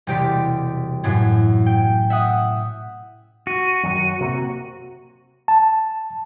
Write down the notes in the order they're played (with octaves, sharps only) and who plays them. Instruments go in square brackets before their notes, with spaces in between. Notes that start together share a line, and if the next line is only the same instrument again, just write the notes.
[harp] E1 C3 G3 G4 D5 B6
F#2 A2 C#4
G5
E5 F#5 D#6
[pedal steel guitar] F#4 [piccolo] D#7
[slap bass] F#2 D#3 F#3
C3 A#3
[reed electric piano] A5